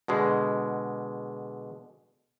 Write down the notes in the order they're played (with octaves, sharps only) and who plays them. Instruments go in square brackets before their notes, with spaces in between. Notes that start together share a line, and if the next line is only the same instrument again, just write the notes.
[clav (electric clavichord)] B2 D3 G#3